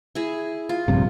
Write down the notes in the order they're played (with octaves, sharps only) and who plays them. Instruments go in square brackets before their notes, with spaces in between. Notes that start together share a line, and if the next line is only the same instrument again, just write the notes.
[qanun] E4 G#4
F4
[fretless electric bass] A#1 G2 C3